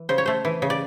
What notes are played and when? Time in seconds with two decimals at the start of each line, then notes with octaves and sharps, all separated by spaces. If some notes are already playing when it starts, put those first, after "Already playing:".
Already playing: E3
0.09 C#3 C5
0.18 C#5
0.26 A3 C5
0.45 E3
0.62 C#3
0.70 D5